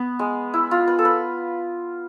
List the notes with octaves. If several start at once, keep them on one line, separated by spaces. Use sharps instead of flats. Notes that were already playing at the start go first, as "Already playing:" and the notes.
Already playing: B3
G#3
E4
F4
B4
A4
B4